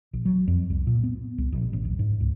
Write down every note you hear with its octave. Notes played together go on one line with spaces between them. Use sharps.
A#1
F#3
F2
C2
A#2
B3
C2
A#1
A1
D1
G#2
C#2